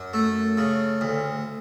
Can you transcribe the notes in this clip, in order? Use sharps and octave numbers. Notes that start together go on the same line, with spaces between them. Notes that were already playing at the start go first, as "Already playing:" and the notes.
Already playing: F#2
A3
C#3
D2